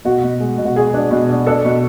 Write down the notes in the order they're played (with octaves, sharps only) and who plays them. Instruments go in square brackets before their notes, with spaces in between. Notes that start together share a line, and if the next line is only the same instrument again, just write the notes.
[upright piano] B2 F#4
B2
G#3
B2
F#4
G#3 G#4
D4
B2
D4
D4 A4
B2